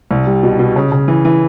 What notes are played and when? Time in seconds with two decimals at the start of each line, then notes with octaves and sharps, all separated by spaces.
0.11 C2
0.27 G3
0.43 B2
0.59 B2
0.76 C#3
0.92 C#3
1.08 E3
1.25 E3